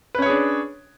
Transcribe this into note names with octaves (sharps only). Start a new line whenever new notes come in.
C#4 D4 G#4 B4 C#5